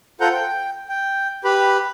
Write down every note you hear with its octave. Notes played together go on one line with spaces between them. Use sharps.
F4 A4 C5 F#5 A#5 G6
G5
G5
G4 B4 B5